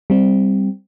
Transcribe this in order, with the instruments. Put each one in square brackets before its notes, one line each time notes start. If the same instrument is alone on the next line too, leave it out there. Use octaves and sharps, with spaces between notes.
[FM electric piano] G3 C4 G4